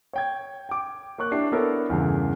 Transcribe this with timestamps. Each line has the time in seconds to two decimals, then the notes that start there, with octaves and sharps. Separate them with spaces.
0.13 C#5 G5 G#6
0.69 G5 D6
1.18 A#3 C#5 C#6 F#6
1.32 D4 E4 G4 C7
1.52 B3 D4 E4 A4 A#4 C#5
1.90 E2 G2 C#3